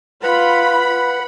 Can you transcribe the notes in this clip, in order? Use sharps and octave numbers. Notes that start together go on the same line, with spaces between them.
F4 B4 F#5 B5